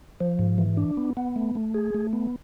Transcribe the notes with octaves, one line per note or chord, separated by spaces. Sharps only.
F3
G#2
E3
D4
B3
B3
A3
A3
G#4
A3
B3